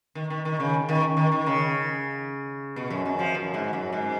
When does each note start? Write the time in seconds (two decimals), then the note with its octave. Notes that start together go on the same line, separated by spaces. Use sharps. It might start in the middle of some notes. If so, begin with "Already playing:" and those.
0.15 D#3
0.30 D#3
0.45 D#3
0.60 C#3
0.89 D#3
1.17 D#3
1.32 D#3
1.46 C#3
2.76 B2
2.90 F#2
3.05 F#2
3.19 F3
3.35 F#2
3.54 G#2
3.73 F#2
3.92 G#2